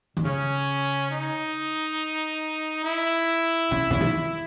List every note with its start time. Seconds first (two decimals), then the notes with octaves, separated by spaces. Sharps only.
0.17 D#3
0.25 C#3 C#4
1.11 D#4
2.84 E4
3.71 C#3
3.91 C#3
4.01 D#3